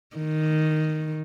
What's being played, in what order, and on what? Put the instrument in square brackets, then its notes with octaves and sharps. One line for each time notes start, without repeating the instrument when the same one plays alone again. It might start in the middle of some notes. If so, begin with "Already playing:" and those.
[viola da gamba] D#3